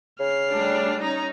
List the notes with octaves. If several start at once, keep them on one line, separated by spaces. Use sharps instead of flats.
C#3 F6 C7
G3 A3 D4
C#4 D#4 A#5